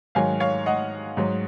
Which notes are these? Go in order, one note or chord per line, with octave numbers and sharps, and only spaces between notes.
G#2 D#3 F#3 F5 G#5
C#5 F5
D#5 F#5
G#2 F#3